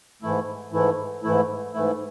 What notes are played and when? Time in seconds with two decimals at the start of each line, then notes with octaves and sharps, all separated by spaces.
0.22 G#2 E3 A3 E4
0.72 G#2 E3 A3 E4
1.23 G#2 E3 A3 E4
1.74 G#2 E3 A3 E4